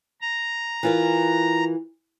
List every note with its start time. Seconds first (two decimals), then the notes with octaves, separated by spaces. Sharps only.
0.21 A#5
0.83 E3 F4 A#4